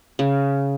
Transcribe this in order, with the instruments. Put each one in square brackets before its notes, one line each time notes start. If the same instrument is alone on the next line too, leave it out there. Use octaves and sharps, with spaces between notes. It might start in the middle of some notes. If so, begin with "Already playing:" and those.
[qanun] C#3